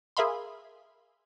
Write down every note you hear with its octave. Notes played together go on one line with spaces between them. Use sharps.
G#4 A#4 E5 F5 B5 C6